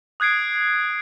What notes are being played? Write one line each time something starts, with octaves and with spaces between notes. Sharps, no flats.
D#6 F#6 G#6 C7 D7